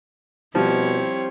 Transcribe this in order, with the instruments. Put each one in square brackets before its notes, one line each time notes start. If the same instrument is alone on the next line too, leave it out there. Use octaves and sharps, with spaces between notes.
[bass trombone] B2 [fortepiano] F3 G3 [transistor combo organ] C4 G4 C5 [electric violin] E4 C#5